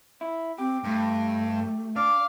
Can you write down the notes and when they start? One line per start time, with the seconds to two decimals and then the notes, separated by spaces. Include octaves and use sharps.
0.21 E4
0.58 C4 G4
0.84 G2 A3
1.96 D4 F5 D6